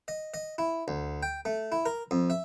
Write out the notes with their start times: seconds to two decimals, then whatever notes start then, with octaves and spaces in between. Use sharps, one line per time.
0.08 D#5
0.34 D#5
0.58 E4
0.88 D2
1.23 G5
1.45 A3
1.72 E4
1.86 A#4
2.11 F2
2.30 E5